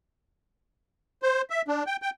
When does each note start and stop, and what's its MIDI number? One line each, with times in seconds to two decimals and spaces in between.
1.22 1.42 72
1.50 1.62 76
1.68 1.83 62
1.87 1.96 79
2.02 2.10 79